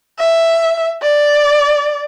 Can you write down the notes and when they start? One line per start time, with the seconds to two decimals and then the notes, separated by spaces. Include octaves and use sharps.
0.19 E5
1.02 D5